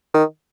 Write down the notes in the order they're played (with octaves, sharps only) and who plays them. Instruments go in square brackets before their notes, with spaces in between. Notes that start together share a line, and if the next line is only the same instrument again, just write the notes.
[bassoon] D#3